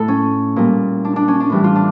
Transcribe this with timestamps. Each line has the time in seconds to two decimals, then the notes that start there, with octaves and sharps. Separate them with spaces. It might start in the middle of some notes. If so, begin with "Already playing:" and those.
Already playing: A2 A4
0.08 C#4
0.56 A#2 G3
1.05 D4
1.16 D4
1.28 C#4
1.40 D4
1.50 A2 E3 G3
1.64 F4
1.76 D4